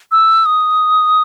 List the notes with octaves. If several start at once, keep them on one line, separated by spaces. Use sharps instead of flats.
E6
D#6